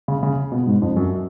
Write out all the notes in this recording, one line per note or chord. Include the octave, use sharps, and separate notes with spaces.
C#3
C#3
B2
G#2
F2
F#2